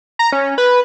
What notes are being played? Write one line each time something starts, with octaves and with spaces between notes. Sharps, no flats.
A#5
C#4
B4